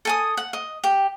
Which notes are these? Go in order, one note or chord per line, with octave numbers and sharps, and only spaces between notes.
A4 G#5 D#6
F#5
D#5
G4 G5